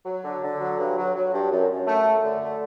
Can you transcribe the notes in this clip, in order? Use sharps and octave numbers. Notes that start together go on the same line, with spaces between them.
F#3
D3
D3
F#3
G2
F#3
F#3
G2
F#2
F#2
A3
F#2
D3
A3